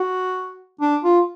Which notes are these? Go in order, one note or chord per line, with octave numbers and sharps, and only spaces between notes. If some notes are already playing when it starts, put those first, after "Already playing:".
Already playing: F#4
D4
F4